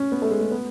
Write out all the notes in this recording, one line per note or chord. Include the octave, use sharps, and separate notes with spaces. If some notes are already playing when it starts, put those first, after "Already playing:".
Already playing: C#4
B3
A3
G#3
G#3
B3